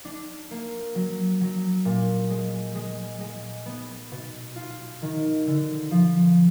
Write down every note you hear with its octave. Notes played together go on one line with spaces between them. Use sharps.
D4
A#3
F#3
F#3
A#2
G#3
G#3
G#3
B3
B2
F4
D#3
D3
F3